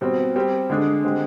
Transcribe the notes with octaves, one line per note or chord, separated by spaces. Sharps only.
B2 G3 C4
G3 C4 G4
D3 G#3 D4 G#4
D3 G#3 C4 G4